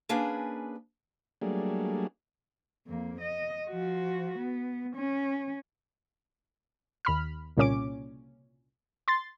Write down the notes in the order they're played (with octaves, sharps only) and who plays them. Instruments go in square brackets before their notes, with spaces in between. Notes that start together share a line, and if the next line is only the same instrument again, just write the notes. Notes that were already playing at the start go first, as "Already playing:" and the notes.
[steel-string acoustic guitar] A#3 C#4 D4 G#4 B4
[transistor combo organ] F#3 G3 A3 A#3 D4 G#4
[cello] F2 A#3
D#5
F3 F#4
B3
C#4
[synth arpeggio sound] D#2 B5 F6
C2 A#2 C#3 C#4 D6 D7
C6 A6